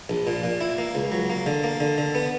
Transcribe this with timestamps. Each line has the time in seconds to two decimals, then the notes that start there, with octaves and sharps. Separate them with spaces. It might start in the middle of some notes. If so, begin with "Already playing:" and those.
0.09 A#1
0.27 A#2
0.43 A#2
0.61 E4
0.78 A#3
0.95 C#2
1.12 F#3
1.30 A#3
1.46 D3
1.64 A#3
1.80 D3
1.98 D3
2.15 B3